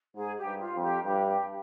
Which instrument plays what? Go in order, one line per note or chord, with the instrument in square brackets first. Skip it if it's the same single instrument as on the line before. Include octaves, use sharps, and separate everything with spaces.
[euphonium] G#2 [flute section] G#4
[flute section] G4
[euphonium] G2
[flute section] F4
[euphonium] F2
[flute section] G4
[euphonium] G2 [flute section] G4
[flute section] G4